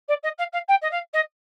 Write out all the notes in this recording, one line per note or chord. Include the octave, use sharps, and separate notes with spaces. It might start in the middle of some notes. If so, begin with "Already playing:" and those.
D5
D#5
F5
F5
G5
D#5
F5
D#5